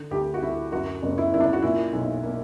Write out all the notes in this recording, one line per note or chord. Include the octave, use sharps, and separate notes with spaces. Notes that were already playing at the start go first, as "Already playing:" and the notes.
Already playing: D3
D2 G4
F#4
D2 E4
F#2 F#4
F#1
E4
F#1 E4
D4
F#4
A#2 E4
B1
A#3